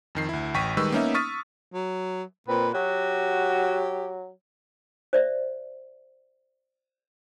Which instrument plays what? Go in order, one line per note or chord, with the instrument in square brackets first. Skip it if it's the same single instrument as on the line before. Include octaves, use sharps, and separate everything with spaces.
[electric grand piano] F2 D#3 C7
D2 E4
A1 G5 C#6 B6 D#7
D#3 G3 G#3 B4 C#6 E6
A#3 B3 C#4 D#4 E5
C#6 D#6 F6 A6 B6 D#7
[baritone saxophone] F#3
[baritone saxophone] A#2 [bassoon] C4 [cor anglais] B4
[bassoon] F#3 [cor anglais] F#4 [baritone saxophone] G4
[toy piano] C5 D5 E5